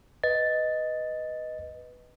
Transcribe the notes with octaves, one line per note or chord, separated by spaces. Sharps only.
B4 D#5 A6